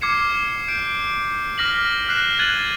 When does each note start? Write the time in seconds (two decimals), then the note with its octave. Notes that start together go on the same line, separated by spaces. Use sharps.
0.01 D6 F6 G#6 C7 C#7 E7
0.68 G6 D7
1.58 D6 F6 A#6 B6 F#7
2.09 F6 F#6 A#6 C7 E7
2.39 F#6 G#6 A6 D#7 F#7